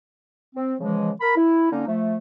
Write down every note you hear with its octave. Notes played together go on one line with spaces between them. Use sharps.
C4
C#3 E3 F3 G#3
A#4 B5
E4
D3 A#3 C#4 D#4
F3 A3